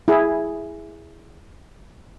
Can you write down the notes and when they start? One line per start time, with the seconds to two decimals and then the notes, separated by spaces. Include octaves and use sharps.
0.08 E4 G#4